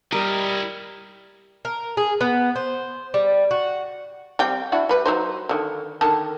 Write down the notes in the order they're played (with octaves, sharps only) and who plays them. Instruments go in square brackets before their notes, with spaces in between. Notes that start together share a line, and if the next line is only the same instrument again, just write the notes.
[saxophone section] G3 [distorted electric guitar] E4 D#5 [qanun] A#4
[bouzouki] A#4
G#4
B3
C5
G3
F#4
[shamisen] G3 C4 G5
D4 E4 F#4
G3 B4
F#3 D#4 C5
D3 D#3
D3 D#3 A5